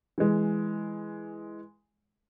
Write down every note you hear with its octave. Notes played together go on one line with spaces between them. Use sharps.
E3 G#3